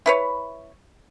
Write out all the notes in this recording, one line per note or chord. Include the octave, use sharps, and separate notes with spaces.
E4 B4 C#5